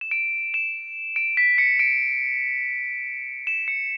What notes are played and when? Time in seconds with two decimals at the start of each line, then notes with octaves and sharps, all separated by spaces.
0.01 E7
0.11 D7
0.54 E7
1.16 D7
1.37 B6
1.58 C#7
1.79 D7
3.47 E7
3.68 C#7